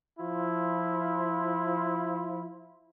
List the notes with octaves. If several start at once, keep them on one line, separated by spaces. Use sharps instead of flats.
F3 E4 F4